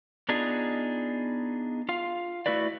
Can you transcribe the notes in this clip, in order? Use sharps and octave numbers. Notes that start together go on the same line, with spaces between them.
B3 D4 D#4 F4 G#4
F4 F5
A3 E4 F#4 B4 D5